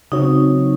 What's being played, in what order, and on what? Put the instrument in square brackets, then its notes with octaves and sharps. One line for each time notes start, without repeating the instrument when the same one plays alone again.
[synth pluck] C#3 F#3 C4 F#4 C#5 [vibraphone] D#4